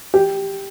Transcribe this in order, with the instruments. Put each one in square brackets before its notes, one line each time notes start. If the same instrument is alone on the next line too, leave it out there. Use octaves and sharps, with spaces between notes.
[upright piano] G4